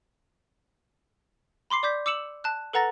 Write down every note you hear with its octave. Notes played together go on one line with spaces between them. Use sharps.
B5 C6 D6 C7
D5 D6 G6 B6
D6 E6 C#7 E7 F#7
A5 F#6
A4 B4 F#5 A#5 A6 A#6